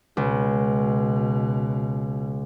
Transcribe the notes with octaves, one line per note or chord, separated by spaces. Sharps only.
C#2 B2